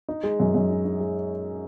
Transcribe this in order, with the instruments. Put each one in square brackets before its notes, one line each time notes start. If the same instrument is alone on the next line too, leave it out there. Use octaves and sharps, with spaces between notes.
[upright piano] D#4
G#3
F#2
F#2
D#4
D#4
G#3